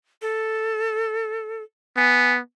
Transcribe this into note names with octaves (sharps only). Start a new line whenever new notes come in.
A4
B3 G#5